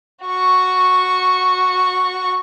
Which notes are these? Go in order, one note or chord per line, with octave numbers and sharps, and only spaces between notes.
F#4 C#6